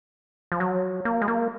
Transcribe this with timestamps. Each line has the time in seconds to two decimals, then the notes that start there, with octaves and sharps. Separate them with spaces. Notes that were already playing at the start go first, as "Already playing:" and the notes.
0.52 F3
0.60 F#3
1.05 A#3
1.22 G#3
1.28 A#3